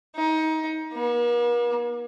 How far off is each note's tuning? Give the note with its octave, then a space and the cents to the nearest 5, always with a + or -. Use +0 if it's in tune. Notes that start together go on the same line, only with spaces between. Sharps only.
D#4 +25
A#3 +45